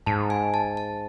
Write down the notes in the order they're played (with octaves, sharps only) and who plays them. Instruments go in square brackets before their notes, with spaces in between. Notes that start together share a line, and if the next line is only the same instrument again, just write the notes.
[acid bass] G#2 [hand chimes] A5
[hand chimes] G#5
A5
A5